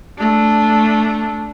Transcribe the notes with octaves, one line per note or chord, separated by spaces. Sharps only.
A3 D4